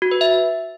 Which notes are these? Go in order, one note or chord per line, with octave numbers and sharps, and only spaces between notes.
F#4
B4
E5